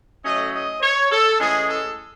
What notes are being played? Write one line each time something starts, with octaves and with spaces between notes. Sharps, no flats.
A2 F#3 A3 C#4 D#5
D#5
C#5
A4
A2 E3 G#3 C#4 G#4
A4